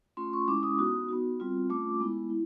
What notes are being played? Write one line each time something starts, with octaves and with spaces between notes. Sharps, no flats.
A3 C#4 F4 C6
C#6
G#3 C#4 E4 D6
D#6
B3 D#4 F#4 D#6
B3 D#4 F#4
G3 C4 F4
A3 C#4 F4 D6
G#3 B3 E4
E4